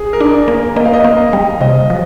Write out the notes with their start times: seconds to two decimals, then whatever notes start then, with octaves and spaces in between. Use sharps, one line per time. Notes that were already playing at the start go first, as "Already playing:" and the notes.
Already playing: G#4
0.13 A#4
0.21 D4
0.34 D5
0.48 A#3
0.76 A#3 D#5
0.85 F5
0.93 D#5
1.04 A#3
1.33 G3
1.61 C3 D#5
1.90 F3